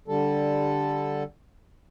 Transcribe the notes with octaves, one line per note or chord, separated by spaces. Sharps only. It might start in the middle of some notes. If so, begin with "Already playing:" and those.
D3 G3 A4